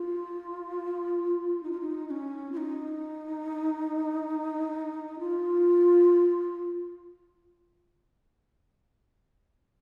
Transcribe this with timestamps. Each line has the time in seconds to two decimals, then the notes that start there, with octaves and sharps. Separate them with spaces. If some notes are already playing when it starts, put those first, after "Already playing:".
Already playing: F4
1.63 D#4
1.71 F4
1.80 D#4
2.07 D#4
2.11 C#4
2.52 F4
2.57 D#4
5.19 F4